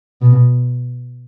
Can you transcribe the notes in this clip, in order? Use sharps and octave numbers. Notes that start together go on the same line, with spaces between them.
B2